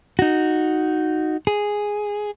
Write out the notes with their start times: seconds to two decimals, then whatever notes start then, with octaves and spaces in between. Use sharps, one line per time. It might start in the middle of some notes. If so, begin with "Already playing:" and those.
0.19 D#4 F#4
1.47 G#4